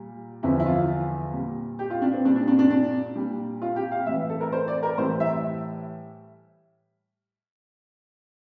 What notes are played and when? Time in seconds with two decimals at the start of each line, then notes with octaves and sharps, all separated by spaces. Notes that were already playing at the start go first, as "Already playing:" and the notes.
Already playing: A#2 G3
0.43 E2 D3 F3 E4
0.60 E4
0.66 F4
1.33 A#2 G3
1.79 G4
1.90 F4
2.02 D4
2.14 C4
2.25 A#2 G3 D4
2.36 D4
2.48 D4
2.59 D4
2.70 D4
3.16 A#2 G3
3.62 F4
3.76 G4
3.92 F5
4.06 A2 E3 G3 E5
4.30 A4
4.41 A#4
4.52 C5
4.68 D5
4.83 A#4
4.98 A2 E3 G3 C5
5.20 E5